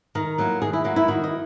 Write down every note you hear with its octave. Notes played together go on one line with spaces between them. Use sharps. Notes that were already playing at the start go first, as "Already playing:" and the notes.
D#3 A#4
F#3 A#3 E4
D#3 G#4
E4
F#3 A#3 E4 F#4
E4
D#3 F#4
D#5